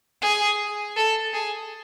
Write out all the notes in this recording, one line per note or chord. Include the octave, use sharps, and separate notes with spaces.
G#4
A4
G#4